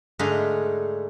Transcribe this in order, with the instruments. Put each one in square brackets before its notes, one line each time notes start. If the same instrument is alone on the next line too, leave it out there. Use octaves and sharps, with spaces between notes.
[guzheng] G#2 D3 A3 G#4 D#5 F5